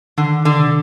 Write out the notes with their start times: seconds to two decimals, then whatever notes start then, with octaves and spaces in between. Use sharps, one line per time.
0.18 D3 D#3
0.45 D3
0.58 C3